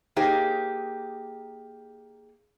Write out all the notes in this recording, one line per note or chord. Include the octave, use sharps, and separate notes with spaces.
A#3 D#4 G4 G#4 C5